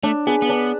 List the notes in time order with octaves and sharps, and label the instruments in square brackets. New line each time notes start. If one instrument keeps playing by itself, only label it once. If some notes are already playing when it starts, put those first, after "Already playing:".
[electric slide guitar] A3 [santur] D4
[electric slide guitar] B3 [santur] G#4 B4
[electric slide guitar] B3
[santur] D4